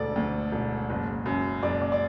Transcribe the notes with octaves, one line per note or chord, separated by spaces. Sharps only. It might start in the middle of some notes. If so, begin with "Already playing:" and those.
Already playing: E1 D2 A4 D5
D2
E1
F#1
F#2
F#1 D5
D5
D5